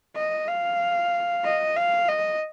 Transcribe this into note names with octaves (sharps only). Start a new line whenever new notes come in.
D#5
F5
D#5
F5
D#5